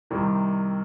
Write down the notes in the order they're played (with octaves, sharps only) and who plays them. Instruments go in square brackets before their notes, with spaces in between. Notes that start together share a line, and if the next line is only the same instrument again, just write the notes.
[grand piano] C2 C3 D#3 G3